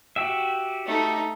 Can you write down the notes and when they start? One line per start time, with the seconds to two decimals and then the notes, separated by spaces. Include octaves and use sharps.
0.16 F#4 G4 E5
0.86 A3 D#4